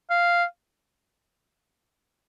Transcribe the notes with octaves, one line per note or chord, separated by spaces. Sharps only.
F5